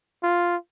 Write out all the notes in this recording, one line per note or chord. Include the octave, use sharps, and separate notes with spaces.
F4